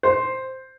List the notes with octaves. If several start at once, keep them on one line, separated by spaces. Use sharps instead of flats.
C5